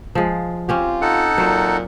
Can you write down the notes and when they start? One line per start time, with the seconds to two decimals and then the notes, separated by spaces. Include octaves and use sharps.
0.15 F3 G#3
0.69 C4 C#4 F4 G4
1.02 D#4 A4 F#5
1.38 A#2 F#3 C5